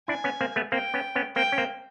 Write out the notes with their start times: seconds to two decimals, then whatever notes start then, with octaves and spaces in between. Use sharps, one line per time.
0.08 D4 E4 G#5
0.24 B3 C#4
0.41 A#3 C4
0.56 A3 B3
0.72 A#3 C4 G5
0.94 B3 C#4
1.15 B3 C#4
1.36 A#3 C4 G5
1.52 C#4
1.58 A#3 C4